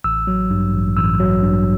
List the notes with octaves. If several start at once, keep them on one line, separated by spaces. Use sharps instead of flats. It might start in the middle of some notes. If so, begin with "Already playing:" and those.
A1 E6
F#3
G2
A1
A1 E6
F#3
G2